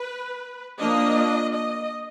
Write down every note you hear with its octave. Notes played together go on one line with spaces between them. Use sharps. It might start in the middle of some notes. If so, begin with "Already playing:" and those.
Already playing: B4
F3 A#3 D4 D#5
D#5